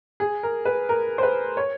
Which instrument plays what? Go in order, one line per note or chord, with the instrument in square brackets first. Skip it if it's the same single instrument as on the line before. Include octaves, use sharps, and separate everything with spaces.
[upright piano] G#4
A#4
B4
A#4
C5
B4
C#5